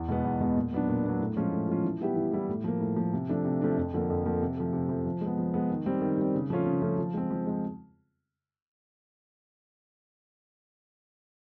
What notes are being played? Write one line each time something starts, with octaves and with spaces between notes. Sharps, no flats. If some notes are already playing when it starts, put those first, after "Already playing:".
Already playing: E2
B2 G#3 B3
E2
B2 G#3 B3
A#2
F#3 B3 D4
A#2
F#3 B3 D4
A2
F3 G#3 C#4 F4
A2
F3 G#3 C#4 F4
E3
G3 B3 E4 G4
E3
G3 B3 E4 G4
A2
F3 A#3
A2
F3 A#3
C3
F3 A3 D4
C3
F3 A3 D4
F2
D3 F3 A#3
F2
D3 F3 A#3
C3
F3 A3
C3
F3 A3
F3
G#3
B3
F3
G#3 B3
D#3
G3 C4
D#3
G3 C4
C#3
F3 A3 C#4 F4
C#3
F3 A3 C#4 F4
F3
G#3 C4
F3
G#3 C4